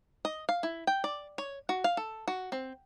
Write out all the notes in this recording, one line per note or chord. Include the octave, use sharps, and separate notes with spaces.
D#5
F5
E4
G5
D5
C#5
F#4
F5
A4
F#4
C4